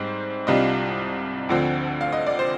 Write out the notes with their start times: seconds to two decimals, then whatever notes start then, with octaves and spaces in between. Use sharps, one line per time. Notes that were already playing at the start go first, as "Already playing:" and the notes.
Already playing: G#2 G3 C4 C5
0.47 C2 C3 G3 D4 F4 D#5
1.49 D2 D3 F3 C4
2.01 F5
2.13 D#5
2.27 D5
2.39 C5